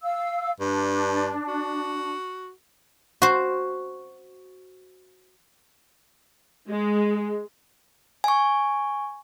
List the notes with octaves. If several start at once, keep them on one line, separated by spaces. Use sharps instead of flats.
F5 E6
G2 D4
F#4
F#4 C5
G#3
G#5 C#6